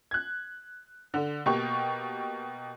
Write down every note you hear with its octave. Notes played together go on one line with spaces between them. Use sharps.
F#6 G#6
D3
B2 A#3 G4 C#6